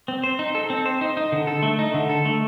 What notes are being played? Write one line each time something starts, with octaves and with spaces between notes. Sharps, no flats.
C4
C5
D#4
A4
C4
C5
D#4
D#4
D3
A4
A3
D#4
D3
A4
A3